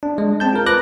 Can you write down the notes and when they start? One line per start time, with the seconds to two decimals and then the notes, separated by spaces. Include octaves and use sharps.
0.03 D4
0.18 G#3
0.40 C4 A5 G6
0.53 F4 A#4
0.66 B4 D6 F#6 A#6